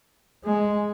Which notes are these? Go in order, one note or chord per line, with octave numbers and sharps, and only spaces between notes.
G#3